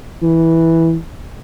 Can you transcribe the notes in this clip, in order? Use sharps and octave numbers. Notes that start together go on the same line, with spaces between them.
E3